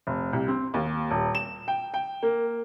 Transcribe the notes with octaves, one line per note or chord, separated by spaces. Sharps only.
F1
C2
C4
D#2
D#1
E7
G5
G5
A#3